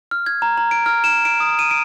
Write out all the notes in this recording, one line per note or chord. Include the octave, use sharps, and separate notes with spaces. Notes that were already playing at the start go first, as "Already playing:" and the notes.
F6
G#6
A#5
A#5
D7
F6
E7
D7
D#6
D#7
D7